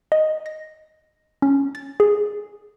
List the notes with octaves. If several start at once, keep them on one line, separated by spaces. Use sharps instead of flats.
D#5
A#6
C#4
A6
G#4